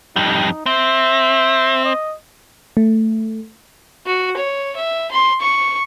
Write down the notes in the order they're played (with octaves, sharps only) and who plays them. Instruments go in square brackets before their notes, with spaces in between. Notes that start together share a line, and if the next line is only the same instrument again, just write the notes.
[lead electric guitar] F2 G3 [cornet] D#4
[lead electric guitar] C4 [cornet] E5
[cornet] D#5
[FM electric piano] A3
[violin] F#4
C#5
E5
C6
C#6